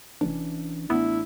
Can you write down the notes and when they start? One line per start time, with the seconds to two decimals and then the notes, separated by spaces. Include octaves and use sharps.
0.21 F1 E3 C#4 D4
0.90 A1 A3 B3 D4 E4